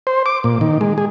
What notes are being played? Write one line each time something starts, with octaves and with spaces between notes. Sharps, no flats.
C5
D6
A#2
D#3
G#3
G#4